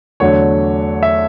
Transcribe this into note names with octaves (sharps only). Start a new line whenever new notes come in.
E2 D3 F#3 A3 C#5
E5